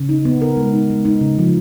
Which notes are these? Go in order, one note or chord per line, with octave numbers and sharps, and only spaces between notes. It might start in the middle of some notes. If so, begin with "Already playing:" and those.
Already playing: C#3
D#4
B3
A#4
G#3
D#4
G#3
D#4
C#3
F3